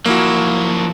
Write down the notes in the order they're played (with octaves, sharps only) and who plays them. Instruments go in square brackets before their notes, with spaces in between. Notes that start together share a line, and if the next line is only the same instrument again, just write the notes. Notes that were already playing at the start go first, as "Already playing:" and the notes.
[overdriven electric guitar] F3 F#3 [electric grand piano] A#3 E4 F#4